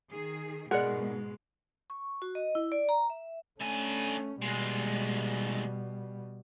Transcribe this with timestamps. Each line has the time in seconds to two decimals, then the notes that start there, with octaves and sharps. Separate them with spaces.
0.12 D#3 G#4
0.71 G#2 B2 G#3 A#4 D5 F#5
1.90 C#6
2.22 F#4
2.35 D#5
2.55 E4
2.72 D5
2.89 A#5
3.10 E5
3.60 D3 A3 C#4 G#5
4.42 D#2 B2 G3 G#3